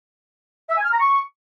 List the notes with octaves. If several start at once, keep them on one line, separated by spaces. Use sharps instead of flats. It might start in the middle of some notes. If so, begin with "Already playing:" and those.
E5
G#5
F6
A#5
C#6